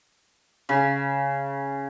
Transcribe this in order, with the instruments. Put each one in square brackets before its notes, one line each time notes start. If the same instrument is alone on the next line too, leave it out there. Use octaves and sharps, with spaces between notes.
[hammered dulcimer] C#3